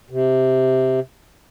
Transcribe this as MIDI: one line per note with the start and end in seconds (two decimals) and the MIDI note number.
0.10 1.00 48